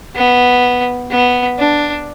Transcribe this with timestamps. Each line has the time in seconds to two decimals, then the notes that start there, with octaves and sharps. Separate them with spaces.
0.15 B3
1.11 B3
1.58 D4